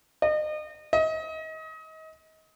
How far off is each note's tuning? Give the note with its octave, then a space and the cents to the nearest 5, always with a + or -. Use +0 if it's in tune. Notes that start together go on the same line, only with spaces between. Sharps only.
D#5 -35
D#5 +30